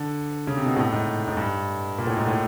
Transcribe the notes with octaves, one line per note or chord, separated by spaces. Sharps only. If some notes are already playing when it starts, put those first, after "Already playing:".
Already playing: D3
C#3
C3
B2
A2
G#2
G#2
G2
A#2
A2
G#2
A2